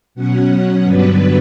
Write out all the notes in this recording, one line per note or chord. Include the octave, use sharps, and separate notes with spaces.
B2 F#3 C#4 F#5
G2 D3 F#3 B3 D4 B4